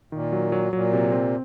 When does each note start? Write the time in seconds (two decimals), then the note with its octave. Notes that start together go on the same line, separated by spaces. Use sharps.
0.12 A#2 D#3
0.32 F#3
0.52 F#3
0.72 A#2 F#3
0.93 C3
1.12 C4